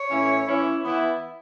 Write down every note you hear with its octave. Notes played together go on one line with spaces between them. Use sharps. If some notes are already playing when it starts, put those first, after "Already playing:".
Already playing: C#5
A2 E3 C#4 E4
E3 C#4 E4
E3 B3 E4